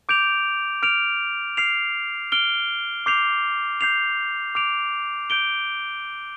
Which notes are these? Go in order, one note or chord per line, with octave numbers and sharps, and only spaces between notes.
D6 G6 D7 F7
F6 D7 F7
F6 C7 F7
F6 D7 G7
D6 G6 C7 F7
G6 C7 F7
D6 F6 D7 F7
G6 D7 G7